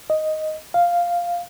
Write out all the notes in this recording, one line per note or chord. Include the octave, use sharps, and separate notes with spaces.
D#5
F5